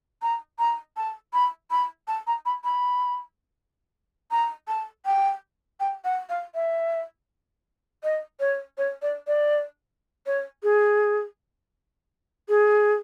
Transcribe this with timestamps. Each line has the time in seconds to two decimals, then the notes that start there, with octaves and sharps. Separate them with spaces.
0.22 A#5
0.59 A#5
0.97 A5
1.33 B5
1.71 B5
2.08 A5
2.27 A#5
2.45 B5
2.64 B5
4.31 A#5
4.68 A5
5.05 G5
5.80 G5
6.04 F#5
6.29 F5
6.55 E5
8.03 D#5
8.40 C#5
8.78 C#5
9.02 D5
9.27 D5
10.26 C#5
10.63 G#4
12.49 G#4